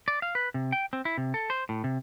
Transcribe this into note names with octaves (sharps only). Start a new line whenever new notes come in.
D5
F5
B4
C3
G5
C4
E4
C3
A4
C5
A2
C3